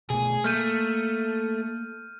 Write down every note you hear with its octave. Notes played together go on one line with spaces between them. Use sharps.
B2 A3 G#4
A3 A#3 F6 G6 D#7